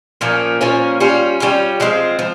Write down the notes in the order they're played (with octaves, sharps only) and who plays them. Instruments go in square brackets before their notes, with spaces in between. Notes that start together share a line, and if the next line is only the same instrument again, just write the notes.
[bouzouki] A#2 F3 A#3 C#4
A#2 F3 A#3 C#4
G3 C#4 F4
G3 C#4 F4
F3 G#3 C4
F3